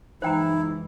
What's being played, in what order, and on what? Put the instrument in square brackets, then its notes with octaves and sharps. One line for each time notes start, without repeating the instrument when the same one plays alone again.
[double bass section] F#1 E3 G#3 [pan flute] D#4 [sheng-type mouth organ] E4 [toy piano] C5 G5 A#5